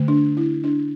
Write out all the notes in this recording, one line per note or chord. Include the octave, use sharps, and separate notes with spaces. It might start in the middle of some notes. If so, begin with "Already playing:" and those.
Already playing: D3 A3
D4
E4
D4